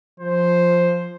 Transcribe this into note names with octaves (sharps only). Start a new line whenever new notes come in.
F3 C5